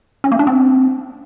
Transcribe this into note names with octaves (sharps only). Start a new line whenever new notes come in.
C#4
A#3
D4
C4